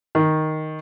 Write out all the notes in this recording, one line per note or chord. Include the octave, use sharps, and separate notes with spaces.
D#3